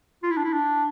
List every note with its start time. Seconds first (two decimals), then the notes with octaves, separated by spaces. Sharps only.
0.23 F4
0.30 E4
0.37 D4
0.44 E4
0.53 D4